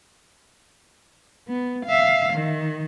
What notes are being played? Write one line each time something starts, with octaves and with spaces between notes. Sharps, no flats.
B3
E5 F5
D#3